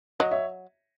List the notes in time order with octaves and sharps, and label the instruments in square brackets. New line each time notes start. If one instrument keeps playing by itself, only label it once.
[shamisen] F#3 [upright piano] D#5
[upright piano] C#5 E5